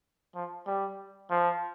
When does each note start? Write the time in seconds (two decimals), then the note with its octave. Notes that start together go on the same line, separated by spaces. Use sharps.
0.35 F3
0.67 G3
1.30 F3